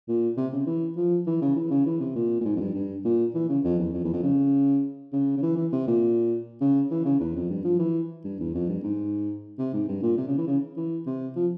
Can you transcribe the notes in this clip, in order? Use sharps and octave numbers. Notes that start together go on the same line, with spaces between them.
A#2
C3
C#3
E3
F3
E3
C#3
E3
C#3
E3
C3
A#2
A#2
G#2
F2
G2
G2
A#2
E3
C#3
F2
E2
F2
E2
F2
C#3
C#3
C#3
E3
E3
C3
A#2
C#3
E3
C#3
E2
F2
G2
F3
E3
G2
E2
F2
G2
G#2
C3
G#2
G2
A#2
C3
C#3
E3
C#3
E3
C3
F3